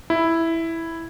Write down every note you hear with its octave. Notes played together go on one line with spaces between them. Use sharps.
E4